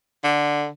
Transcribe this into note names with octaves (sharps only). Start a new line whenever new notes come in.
D3